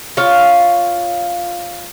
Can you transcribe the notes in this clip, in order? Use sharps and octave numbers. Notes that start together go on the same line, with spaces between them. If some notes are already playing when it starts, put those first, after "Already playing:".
F4 C#5 F5